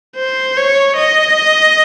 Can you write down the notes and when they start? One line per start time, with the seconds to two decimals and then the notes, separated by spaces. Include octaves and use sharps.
0.16 C5
0.57 C#5
0.97 D#5